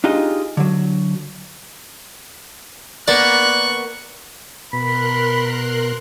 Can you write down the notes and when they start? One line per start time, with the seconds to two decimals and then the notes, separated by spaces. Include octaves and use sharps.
0.04 D4 D#4 F4 G4 G#4 D#5
0.57 D3 F#3
3.08 A#3 B3 A#4 D5 C#6 F#6
4.73 B2 A#4 B5 C6 F#6